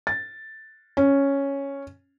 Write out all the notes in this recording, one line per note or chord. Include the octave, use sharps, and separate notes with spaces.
A6
C#4